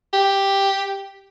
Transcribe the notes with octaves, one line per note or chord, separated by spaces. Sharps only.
G4